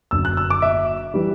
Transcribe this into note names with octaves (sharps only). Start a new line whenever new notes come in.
F#1 F#2 D3 E6
F#6
E6
D6
E5
E3 G3